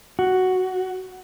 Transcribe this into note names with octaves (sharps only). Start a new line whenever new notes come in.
F#4